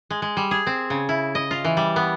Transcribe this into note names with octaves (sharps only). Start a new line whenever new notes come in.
G#3
G#3
G3
G#4
C4
C#3
E4
D#5
F4
E3
G3
B3